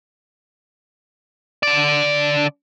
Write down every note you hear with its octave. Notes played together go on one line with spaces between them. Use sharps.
D3 D5